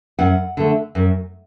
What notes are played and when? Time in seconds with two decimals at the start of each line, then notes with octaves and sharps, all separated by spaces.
0.19 F#2 F#5
0.57 D3 A3
0.95 F#2